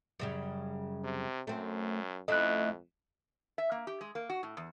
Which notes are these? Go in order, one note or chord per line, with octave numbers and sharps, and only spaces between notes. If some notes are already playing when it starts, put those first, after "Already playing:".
F#2 C#3 G3
C3
F#2 A3 C4
F2 A3 C#4 E4 D#5 F#6
E5
A#3
G4
G#3
A#3
F#4
A2
E2